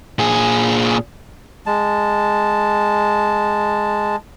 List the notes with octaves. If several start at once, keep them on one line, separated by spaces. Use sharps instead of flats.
A#2 G#4
G#3 A5